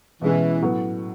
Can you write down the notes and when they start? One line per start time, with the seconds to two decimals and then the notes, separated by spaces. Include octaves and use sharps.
0.21 B2 E3 G#3 C#4
0.62 A2 F#3 B3